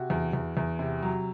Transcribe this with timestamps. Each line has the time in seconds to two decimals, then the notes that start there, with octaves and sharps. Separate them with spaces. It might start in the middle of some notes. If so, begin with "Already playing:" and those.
Already playing: C3 F#4
0.10 E2
0.33 E2
0.57 E2
0.79 C3
1.02 F#3